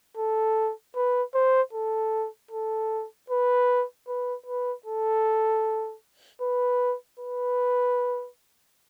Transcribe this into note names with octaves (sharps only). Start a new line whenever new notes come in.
A4
B4
C5
A4
A4
B4
B4
B4
A4
B4
B4